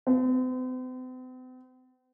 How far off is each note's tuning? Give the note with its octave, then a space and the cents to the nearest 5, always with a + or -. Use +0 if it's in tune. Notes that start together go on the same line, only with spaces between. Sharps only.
C4 -45